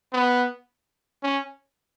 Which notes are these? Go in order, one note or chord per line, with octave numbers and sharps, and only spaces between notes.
B3
C#4